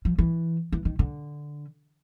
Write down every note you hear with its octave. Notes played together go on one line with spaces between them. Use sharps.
F3
E3
E3
D#3
D3